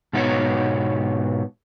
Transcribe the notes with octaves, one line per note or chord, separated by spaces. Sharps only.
G#2 B2 B3 D#4 F#4 C#5